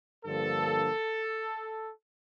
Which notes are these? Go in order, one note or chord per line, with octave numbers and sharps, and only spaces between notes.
G2 D3 F3 A#3 A4